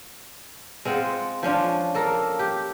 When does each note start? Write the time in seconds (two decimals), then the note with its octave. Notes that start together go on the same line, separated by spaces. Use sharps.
0.85 G#3 C4 F4 F#5
1.43 F3 C#4 D4 F4
1.95 A#3 A4 A#4
2.39 G4